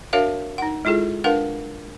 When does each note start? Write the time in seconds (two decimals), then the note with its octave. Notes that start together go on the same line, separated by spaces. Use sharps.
0.13 D4 F#4 A#4 C#5 E5 F5
0.58 D#4 F#5
0.85 G#3 E4 F4 G#4 A4
1.24 D4 A#4 B4 F5 F#5